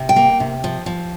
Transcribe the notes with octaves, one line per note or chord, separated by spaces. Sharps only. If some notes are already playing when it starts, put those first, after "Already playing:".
Already playing: C3
G5
A#3
C3
F3
F3